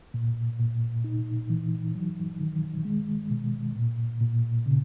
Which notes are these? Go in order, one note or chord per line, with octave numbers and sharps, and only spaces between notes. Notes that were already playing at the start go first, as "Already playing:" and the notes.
A#2
A#2
D#4
E3
F#3
D#3
G#3
B2
A#2
A#2
C#3